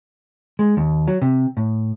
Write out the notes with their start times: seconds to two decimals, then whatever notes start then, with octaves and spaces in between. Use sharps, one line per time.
0.59 G#3
0.77 D#2
1.08 F#3
1.22 C3
1.57 A2